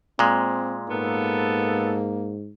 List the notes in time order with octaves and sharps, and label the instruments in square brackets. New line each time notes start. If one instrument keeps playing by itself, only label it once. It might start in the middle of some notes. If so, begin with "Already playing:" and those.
[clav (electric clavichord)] A#2 G#3 [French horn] C4
[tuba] G#2 [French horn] A#3 [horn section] B3 A4